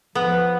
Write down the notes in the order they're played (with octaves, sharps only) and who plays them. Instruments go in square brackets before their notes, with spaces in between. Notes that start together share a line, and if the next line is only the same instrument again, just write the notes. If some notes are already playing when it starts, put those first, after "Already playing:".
[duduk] F3 [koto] B3